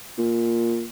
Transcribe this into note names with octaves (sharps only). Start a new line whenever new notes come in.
A#2